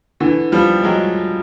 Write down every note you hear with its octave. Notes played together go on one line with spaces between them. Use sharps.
D3 E3
F3 G3
F#3 G#3